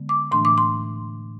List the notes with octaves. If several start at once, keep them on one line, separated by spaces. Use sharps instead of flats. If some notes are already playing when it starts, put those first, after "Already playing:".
Already playing: D3 G#3 B3
D6
A2 E3 A3 D4 C6
D6
C6